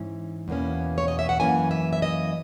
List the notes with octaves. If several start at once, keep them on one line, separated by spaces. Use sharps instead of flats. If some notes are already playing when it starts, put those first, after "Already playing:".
Already playing: G#2 E3 C#4
E2 B2 A#3 C#4
C#5
D#5
E5
F#5
F#2 E3 A#3 C#4 G#5
E5
E5
D#5